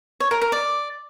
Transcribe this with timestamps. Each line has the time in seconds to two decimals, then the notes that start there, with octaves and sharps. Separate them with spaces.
0.20 C#5
0.31 A#4
0.42 A#4
0.52 D5